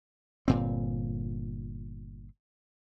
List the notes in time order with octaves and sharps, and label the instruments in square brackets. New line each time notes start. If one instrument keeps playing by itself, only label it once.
[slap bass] G1 A#2 C4